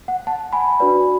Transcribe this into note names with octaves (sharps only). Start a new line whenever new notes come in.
F#5
F#5 A5
G#5 B5
D4 F#4 B4 D5